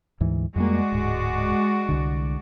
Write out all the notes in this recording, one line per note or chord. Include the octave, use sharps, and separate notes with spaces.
D2 G#2 E3
F2 G3 G#3 A#3 F#4 D5
D1 G#2
C2 D3